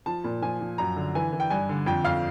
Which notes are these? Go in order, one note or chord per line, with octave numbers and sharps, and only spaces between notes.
F3 A5
A#2
F3 G#5
F3
F#2 A#5
D3
E3 G#5
E3
G5
G2 G#5
D3
F2 G5
F2 F5